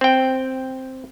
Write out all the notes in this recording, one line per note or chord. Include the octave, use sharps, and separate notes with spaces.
C4 G5